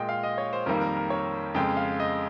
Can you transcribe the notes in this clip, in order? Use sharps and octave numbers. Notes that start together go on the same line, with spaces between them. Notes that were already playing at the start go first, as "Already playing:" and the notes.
Already playing: A#2 G#3 D#5 G5
F5
D#5
C#5
C5
F2 D#3 G3 A#3 A#4
A#4
A#4
C#5
F2 C#3 G#3 G5
F5
D#5